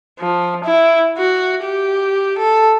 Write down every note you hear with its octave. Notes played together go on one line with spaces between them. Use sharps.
F3
E4
F#4
G4
A4